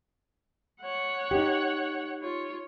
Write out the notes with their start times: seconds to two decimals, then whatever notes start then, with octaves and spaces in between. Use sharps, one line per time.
0.80 C#5 F#5
1.31 D#4 G4
2.21 F4 C#5